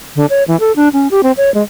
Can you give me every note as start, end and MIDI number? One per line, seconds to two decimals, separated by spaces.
0.16 0.26 50
0.30 0.43 73
0.48 0.59 52
0.60 0.72 69
0.76 0.89 62
0.93 1.08 61
1.11 1.21 67
1.23 1.32 60
1.37 1.53 73
1.54 1.63 56